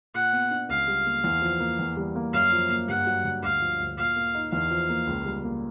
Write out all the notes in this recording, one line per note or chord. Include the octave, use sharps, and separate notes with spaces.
A#2 F#5
B3
D4
C#2 F5
G3
A#3
E2
F3
A#3
E2
G3
A#3
F#2 F5
F3
A#3
G2 F#5
F#3
G2
D2 F5
F3
D2
A#2 F5
A#3
D#4
E2 F5
F3
A#3
C#2
G3
A#3